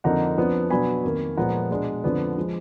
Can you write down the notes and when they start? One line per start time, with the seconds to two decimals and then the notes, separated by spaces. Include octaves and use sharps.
0.04 F2 D3 F3 A#3 D#4 F#5 A#5
0.38 F2 F3 B3 D4
0.70 B2 F#3 B3 D4 G#5 B5
1.04 F2 D#3 A#3
1.37 A#2 F3 G#3 B3 F#5 A#5
1.70 B2 G#3 D4
2.04 F2 D3 F3 B3 D4
2.38 F3 G#3